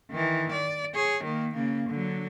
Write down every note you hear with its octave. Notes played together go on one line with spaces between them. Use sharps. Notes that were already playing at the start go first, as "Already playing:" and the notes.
D#3 E3
D5
G#4 C#5
D#3 A#3
C#3 A#3
D3 F#3